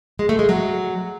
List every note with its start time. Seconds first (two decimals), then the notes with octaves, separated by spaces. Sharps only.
0.19 G#3
0.29 A3
0.39 G#3
0.49 F#3